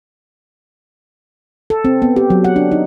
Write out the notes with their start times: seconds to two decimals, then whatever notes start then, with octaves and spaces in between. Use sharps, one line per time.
1.70 A4
1.85 C4
2.02 B3
2.16 G4
2.30 F#3
2.44 F#5
2.56 D4
2.72 D#4